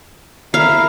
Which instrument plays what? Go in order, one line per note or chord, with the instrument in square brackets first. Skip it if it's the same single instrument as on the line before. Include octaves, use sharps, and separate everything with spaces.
[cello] E4 A#4 [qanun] F5